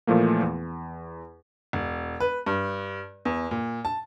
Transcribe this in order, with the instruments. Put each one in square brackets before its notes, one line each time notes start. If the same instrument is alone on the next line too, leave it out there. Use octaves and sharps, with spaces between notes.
[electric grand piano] A#2 E3 F3 A3 A#3
E2
[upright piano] E1
B4
G2
E2
A#2
A5